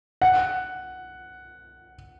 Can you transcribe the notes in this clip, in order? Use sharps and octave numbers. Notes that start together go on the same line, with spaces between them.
F#5